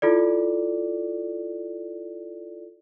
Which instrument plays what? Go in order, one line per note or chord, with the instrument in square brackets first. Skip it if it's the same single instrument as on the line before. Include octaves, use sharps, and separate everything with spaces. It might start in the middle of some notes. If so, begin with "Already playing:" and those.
[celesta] E4 F4 A4 D5